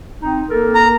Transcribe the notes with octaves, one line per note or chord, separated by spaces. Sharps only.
C4 D#4
A#3 A4 A#4
A#5